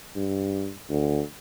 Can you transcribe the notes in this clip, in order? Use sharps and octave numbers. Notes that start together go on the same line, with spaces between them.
G2
D2